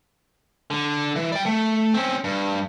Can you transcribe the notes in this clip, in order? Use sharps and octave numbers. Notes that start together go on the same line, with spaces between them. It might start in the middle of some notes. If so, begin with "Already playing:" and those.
D3
E3
D5 G5
A3
C4 C#4
G2